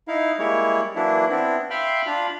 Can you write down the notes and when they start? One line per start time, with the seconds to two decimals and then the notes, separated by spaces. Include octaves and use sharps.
0.08 D#4 E4 F5
0.39 G3 G#3 A#3 E4 C#5
0.95 E3 F#3 A#3 D4 E4
1.29 B3 C4 D4 E4
1.70 E5 F5 G5 B5 C6
2.06 D4 F4 F5 B5